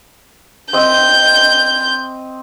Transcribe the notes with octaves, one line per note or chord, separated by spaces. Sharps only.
C4 D#5 G6